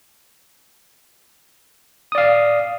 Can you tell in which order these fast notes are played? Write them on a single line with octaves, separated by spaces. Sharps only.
D#6 D5 F5